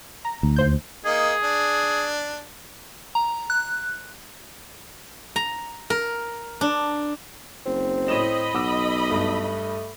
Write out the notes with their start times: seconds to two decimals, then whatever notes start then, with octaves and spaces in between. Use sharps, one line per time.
0.25 A#5
0.43 D2
0.56 D#2 C5 G6
1.05 A#3 D#4 G#4
1.43 D4
3.15 A#5
3.50 F#6
5.36 A#5
5.90 A#4
6.61 D4
7.66 F#1 C4
8.08 A2 C#5 D#5 B5 E7
8.54 B1 F#5 D6 E6
9.11 G2 A3